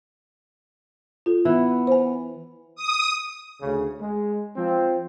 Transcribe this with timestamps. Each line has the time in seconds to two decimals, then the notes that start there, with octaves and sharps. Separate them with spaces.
1.26 F4 A4
1.45 E3 B3
1.87 C5 G#5
2.76 D#6
3.61 D2 C#3
4.01 G#3
4.56 F3 C4